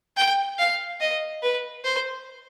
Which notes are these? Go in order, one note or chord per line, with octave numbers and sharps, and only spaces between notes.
G5
F5
D#5
B4
C5